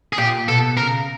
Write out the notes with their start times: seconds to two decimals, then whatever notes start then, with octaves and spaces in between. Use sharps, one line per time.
0.13 G#4
0.18 A#2 G4
0.48 B2 A4
0.77 C#3 A#4